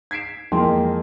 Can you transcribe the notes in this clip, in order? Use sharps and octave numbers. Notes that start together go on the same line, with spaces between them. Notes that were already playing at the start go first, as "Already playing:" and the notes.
G#6 B6 C7 D7 E7
F2 E3 G#3 A#3 G5 C6